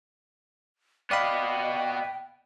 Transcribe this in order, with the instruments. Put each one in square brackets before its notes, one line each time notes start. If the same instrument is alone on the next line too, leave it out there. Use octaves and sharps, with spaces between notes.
[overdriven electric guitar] B3 D#5 [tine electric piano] D5 F5 B5 [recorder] G5